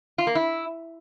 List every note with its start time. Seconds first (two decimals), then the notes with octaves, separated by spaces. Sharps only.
0.18 F4
0.27 A#3
0.35 E4